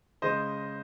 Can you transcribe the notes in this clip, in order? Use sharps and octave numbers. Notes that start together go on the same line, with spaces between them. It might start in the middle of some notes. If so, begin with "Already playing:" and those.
C#3 G#3 C5 D#5